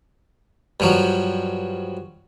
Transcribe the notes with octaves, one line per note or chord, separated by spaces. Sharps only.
G2 F3 F#3